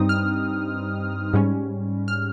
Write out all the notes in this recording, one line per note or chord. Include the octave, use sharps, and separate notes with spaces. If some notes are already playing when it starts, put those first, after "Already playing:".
Already playing: G2 G3 C4 D#4 D#6
F6
G#2 G3 C#4
F6